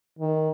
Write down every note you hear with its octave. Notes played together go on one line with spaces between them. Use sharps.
D#3